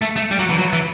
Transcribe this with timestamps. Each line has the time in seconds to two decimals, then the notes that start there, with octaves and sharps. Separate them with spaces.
0.02 A3
0.16 A3
0.31 G3
0.39 F#3
0.50 E3
0.58 F#3
0.73 E3